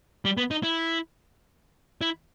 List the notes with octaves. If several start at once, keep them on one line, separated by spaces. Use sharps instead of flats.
G3
B3
D#4
E4
E4